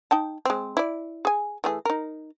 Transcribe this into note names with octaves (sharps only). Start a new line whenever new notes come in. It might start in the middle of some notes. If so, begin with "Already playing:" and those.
D#4 G5 A5
G#3 C4
E4 D5
G#4 G#5
E3 A3 G#4
D#4 A#4